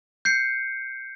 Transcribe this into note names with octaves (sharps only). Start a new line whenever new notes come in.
G6 C7 C#7